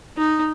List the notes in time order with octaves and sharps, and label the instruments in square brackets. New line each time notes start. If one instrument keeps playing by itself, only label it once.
[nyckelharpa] D#4